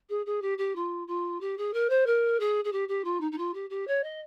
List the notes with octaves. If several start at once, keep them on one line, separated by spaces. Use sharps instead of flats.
G#4
G#4
G4
G4
F4
F4
G4
G#4
A#4
C5
A#4
G#4
G#4
G4
G4
F4
D#4
D#4
F4
G4
G4
C#5
D#5